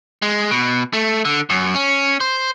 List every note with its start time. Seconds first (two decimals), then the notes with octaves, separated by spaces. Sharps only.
0.22 G#3
0.51 B2
0.93 A3
1.25 D3
1.50 F#2
1.74 C#4
2.21 C5